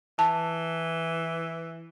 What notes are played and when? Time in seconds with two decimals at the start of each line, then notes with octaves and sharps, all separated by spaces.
0.19 E3 A5